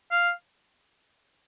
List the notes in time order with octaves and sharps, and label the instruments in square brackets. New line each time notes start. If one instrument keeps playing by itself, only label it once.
[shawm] F5